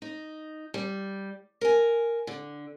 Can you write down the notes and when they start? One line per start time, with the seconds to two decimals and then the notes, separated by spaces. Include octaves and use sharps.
0.02 D#4
0.74 G3
1.61 A#4 G#5
2.27 D3